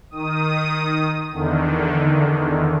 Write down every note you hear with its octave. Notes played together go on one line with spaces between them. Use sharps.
D#3 D#6
E2 D3 D#3